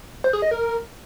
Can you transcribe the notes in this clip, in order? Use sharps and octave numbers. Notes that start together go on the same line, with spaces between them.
C5
G#4
D#5
A#4